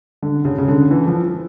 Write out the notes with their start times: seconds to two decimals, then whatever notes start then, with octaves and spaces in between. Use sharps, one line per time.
0.22 D3
0.45 C#3
0.58 C#3
0.68 D3
0.91 E3
1.07 F3